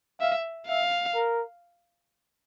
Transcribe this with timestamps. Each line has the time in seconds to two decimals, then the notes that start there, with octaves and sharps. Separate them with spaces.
0.21 E5 F5
0.67 E5 F5
1.15 A#4